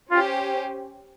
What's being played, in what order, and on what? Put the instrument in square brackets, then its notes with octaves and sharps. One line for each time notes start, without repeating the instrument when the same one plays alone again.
[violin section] C#4 G4 C5 [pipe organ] F4